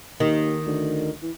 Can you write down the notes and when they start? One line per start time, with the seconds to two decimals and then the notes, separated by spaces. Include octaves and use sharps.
0.20 D#2 D#3
0.67 D2
1.22 E3